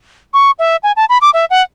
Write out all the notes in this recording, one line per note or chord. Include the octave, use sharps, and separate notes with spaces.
C#6
E5
G#5
A5
B5
D6
E5
F#5